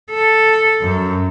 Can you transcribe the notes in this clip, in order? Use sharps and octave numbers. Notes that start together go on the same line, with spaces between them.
A4
F#2